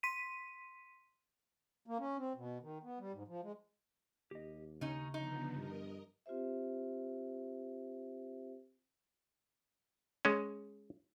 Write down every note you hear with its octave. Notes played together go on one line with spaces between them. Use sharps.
C6 B6 D#7
A#3
C#4
C4
B2
D#3
B3
G3
G#2
F3
G#3
D#2 G4 D#5
C#3 C#4 D#4
D3 F3 B3 D#4
G2 A#4 D#5
C4 F4 G4 C5 E5
G#3 C#4